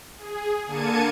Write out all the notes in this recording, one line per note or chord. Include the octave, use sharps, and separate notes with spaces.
G#4
D3 A#3 A5 G#6 C#7 D#7